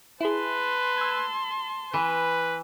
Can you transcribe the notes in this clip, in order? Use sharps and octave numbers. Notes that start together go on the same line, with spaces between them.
E4 G#4 B4 A5 C6
E6 G#6
E3 B4